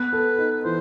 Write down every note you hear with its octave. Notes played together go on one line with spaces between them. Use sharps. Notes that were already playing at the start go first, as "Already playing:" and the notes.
Already playing: B3 B4
A4
D#4
E3 C5